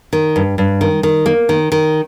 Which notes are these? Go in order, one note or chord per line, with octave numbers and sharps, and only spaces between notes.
D#3
G2
G2
D#3
D#3
A#3
D#3
D#3